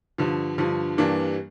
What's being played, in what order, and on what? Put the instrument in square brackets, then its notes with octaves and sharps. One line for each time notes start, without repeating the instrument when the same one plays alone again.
[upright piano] G2 D3 F3
G2 D3 F3
G2 E3 G3 A#3 D4